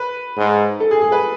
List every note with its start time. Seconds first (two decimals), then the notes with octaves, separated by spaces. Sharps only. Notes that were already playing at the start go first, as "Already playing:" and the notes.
Already playing: B4
0.37 G#2
0.80 A4
0.91 G#4
1.01 G#4
1.12 B4